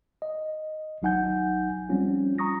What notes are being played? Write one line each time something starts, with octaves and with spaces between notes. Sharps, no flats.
D#5
G#1 F#3 D#4 F#5 G#5 G6
F3 G3 C4 C#4 F4
A#5 C#6 D#6 A#6